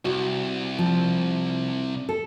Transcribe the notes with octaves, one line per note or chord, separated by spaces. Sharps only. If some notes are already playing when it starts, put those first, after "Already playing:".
C2 F#4
F3
A4